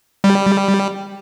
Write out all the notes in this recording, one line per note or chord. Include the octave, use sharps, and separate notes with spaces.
G3